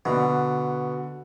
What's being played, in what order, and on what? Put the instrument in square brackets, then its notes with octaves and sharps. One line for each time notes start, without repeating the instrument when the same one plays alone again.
[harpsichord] B2 [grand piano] D3 B3